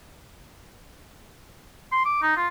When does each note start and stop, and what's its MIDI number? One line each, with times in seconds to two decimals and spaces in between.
1.92 2.05 84
2.05 2.19 86
2.22 2.35 63
2.36 2.47 65